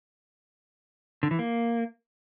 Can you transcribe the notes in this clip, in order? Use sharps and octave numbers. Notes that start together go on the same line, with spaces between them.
D3
E3
A#3